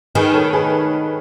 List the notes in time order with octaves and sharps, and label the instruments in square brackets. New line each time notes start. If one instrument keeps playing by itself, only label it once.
[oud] D#3 [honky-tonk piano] G#4 B4
[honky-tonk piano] A4 C#5
G#4 B4